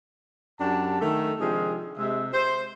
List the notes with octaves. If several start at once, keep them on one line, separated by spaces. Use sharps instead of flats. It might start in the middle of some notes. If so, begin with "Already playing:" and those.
F#2 F#3 D4 G4 F#5 A5
D#3 A3 A4
C3 F3 G#3 D4 G4 G#4
C3 G#3 E5
C5